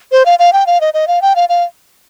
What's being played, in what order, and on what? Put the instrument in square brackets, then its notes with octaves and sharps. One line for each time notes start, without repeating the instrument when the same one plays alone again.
[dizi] C5
F5
F5
G5
F5
D#5
D#5
F5
G5
F5
F5